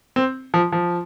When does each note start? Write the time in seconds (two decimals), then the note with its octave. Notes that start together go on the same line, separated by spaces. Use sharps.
0.16 C4
0.54 F3
0.72 F3